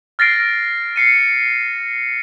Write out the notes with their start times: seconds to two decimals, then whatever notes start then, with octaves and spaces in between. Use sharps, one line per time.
0.19 F6 A6 A#6 C7 D7
0.96 C7 C#7 D#7